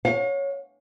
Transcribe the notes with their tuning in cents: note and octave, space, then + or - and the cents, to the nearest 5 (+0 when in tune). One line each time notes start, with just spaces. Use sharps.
C#5 +0 F5 +45